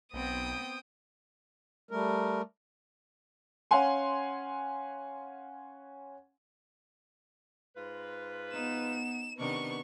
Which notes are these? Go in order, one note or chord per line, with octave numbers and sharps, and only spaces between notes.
B1 B3 C4 G5 D#6
G3 A3 A#4
C#4 F5 F#5 G#5 C6
G#2 F4 B4
B3 D#4 E7
C3 D#3 B3 D4 C#6